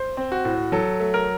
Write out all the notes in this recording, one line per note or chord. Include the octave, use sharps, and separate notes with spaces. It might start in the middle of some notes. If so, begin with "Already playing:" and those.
Already playing: C5
C4
F#4
A2
F#3 A4
A3
A#4